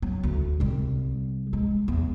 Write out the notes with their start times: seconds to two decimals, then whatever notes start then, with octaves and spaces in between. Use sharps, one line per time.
0.02 F#3
0.23 D2
0.60 C2 G3
1.53 G#3
1.88 E2